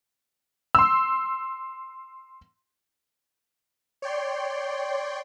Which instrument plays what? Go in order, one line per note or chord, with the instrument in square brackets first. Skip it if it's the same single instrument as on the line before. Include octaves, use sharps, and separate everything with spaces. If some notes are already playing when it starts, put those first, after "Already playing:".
[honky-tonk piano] C6 E6
[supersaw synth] C#5 D5 G5 C6